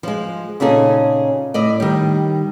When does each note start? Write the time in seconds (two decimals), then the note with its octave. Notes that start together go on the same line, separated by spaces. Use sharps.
0.03 F3 G#3
0.60 A#2 C#3 D#4 G#4 A4
1.54 A2 D5 D#5
1.80 D#3 G3